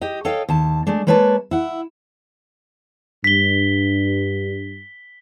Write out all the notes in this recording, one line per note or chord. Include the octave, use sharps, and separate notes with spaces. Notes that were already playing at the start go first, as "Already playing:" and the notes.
G4 D#5
A4 C#5 D#5 F5 G5
D#2 A5
G#3 A3 D4
G#3 A#3 B4 C#5 F5 A5
E4 F#5
G2 B6 G7